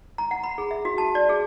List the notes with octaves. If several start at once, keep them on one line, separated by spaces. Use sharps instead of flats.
A#5
F#5
B5
G#4
E5
F#4
A5
D5
G#4